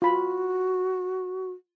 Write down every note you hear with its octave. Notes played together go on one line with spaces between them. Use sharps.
F4 F#4 B5